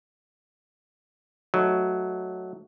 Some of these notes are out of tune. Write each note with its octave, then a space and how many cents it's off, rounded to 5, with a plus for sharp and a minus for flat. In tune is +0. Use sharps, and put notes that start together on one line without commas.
F#3 +0 A3 +0 D#4 +0